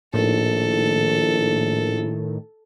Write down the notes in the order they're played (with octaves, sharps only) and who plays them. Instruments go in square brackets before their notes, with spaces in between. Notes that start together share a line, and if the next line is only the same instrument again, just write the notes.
[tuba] A#1 [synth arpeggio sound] A2 D#3 [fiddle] A4